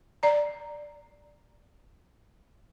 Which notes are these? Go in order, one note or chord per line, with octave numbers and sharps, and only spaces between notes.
D5 A#5